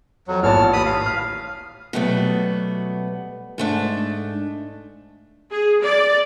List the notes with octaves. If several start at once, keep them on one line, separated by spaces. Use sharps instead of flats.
F2 F#3
A1 A#2 B3 C#5 A5 F6
D#2 B5 D#6
F5
F6
B2 F#3 G3 A3 B3
G#2 A3 D4
G#4
D5